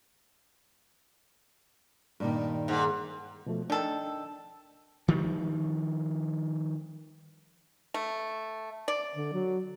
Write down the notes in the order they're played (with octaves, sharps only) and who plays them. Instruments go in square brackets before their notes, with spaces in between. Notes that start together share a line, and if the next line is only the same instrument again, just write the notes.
[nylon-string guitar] G2 A#2 D#3
[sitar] G#2
[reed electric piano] B2 F3 A3
[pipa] D#3 A4 [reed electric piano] D4 G5
[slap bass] D#3 F3 G3
[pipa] A3
D5
[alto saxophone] D3
F#3